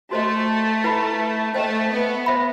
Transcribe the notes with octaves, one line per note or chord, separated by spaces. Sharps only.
A3 F#4 C5 D#5 A5 C6
E4 B4 F#5 B5
A3 C5 D#5 G5
B3
C5 E5 B5